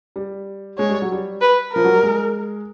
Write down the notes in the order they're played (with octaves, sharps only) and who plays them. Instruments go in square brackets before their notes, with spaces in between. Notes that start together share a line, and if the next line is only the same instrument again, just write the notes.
[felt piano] G3
[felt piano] G#3 [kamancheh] C#5
[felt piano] G3
F#3
G3
[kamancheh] B4
[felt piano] F3 [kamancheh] A#4
[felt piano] F#3
G3
G#3